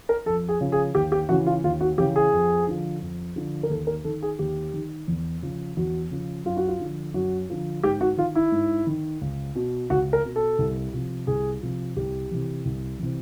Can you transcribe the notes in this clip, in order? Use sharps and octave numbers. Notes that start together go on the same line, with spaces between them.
A#4
F2 A4
G#4
C#3 F3
G#4
D#2 G4
G4
C#3 E3 F#4
F4
D#2 F4
F#4
C#3 E3 G4
G#4
F2
D3 F3
F2
D3 F3
A#4
D#2 A4
A#4
D#3 A4
G#4
D#2 G4
D#3
E2
C#3 F3
E2 F#4
C#3 F3
F#2 F4
F#4
F4
D3 F3
F#2 F#4
D3 F3
G#2 G4
F#4
D#3 F4
E4
G#2
D#3
C#2
B2
C#2 F#4
A#4
B2
A4
C2
C3 F3
C2 G#4
C3 F3
C2 G4
C3 E3
C2
C3 E3